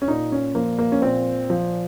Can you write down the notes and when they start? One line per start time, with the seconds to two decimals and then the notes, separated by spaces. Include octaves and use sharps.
0.02 C#4
0.08 A#2 D#4
0.32 C#4
0.55 F3 A#3
0.78 A#3
0.92 C#4
1.02 A#2 C4
1.50 F3